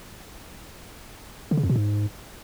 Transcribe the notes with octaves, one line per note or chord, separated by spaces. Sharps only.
D3
C#3
F2
B2
G#2